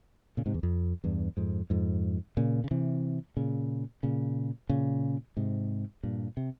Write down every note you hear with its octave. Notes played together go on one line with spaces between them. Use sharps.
A#2 C#3
G#2 C3
E2
F2
E2 G2
F2 G#2
F2 G#2
A#2 C#3
C#3
C3 E3
A#2 C#3
A#2 C#3
A#2 C#3
G#2 C3
G2 A#2
C3